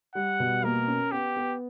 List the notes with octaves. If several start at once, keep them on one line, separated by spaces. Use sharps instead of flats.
G3 F#5
B2
A#3 A#4
C#4
B3 G4
B3